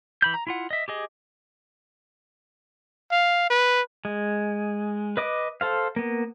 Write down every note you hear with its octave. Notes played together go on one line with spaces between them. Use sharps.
E3 B5 G6
A#5
E4 F4 F#5
D#5 E5
G4 G#4 D#5
F5
B4
G#3
B4 D#5 D6
A4 C5 F5
A#3 B3